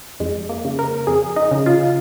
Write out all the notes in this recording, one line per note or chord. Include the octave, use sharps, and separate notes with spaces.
F2 G#3
A#3
C#3
A#4
F2 G#4
D#4
C#3
F4